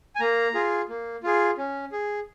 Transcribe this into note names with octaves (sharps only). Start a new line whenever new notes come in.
G#5
A#3 A#5
F4 G#4
A#3
F4 G#4
C#4
G#4